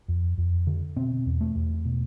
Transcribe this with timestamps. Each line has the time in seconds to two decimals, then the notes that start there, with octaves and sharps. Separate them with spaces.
0.08 F2
0.38 F2
0.67 D3
0.96 B2 C4
1.26 E2
1.41 A3
1.56 E2
1.85 B2